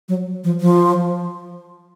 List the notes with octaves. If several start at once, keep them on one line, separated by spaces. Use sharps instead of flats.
F#3
F3
F3